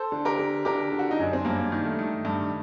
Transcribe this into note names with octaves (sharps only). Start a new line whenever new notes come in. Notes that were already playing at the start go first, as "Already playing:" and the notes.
Already playing: A4 C5
D3
G4 A#4
D3
D3 G4 A#4
D3
F#4
D#4
F#2 D4
C4
G2 A#3
D#3
A3
D#3
G2